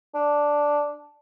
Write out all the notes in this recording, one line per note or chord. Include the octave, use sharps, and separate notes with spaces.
D4